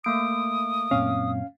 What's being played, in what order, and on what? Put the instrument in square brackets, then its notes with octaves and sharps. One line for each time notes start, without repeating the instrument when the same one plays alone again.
[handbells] A3 A#3 D7 [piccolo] D#6
[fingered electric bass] F#2 A#2 C4 [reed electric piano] C#4 F5